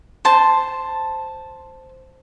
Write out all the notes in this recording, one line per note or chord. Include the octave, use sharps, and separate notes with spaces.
C5 A5